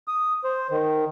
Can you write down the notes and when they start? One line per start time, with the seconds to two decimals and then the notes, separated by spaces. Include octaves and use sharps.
0.08 D#6
0.44 C5
0.71 D#3